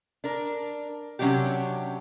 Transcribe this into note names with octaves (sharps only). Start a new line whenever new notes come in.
D4 A#4
C3 F#3 C#4 D4 G4